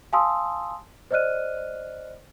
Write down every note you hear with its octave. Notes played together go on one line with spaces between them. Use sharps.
F5 G#5 A5 C6 D#6 E6
C5 D5 D#5 F6 F#6 D#7